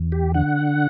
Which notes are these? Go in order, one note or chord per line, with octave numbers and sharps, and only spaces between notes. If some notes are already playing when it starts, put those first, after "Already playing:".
Already playing: E2
G4
D3 F#5